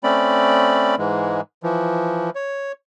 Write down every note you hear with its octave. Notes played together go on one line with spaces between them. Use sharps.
A3 C4 C#4 D5 B5
G#2 E3 G#3
E3 F3
C#5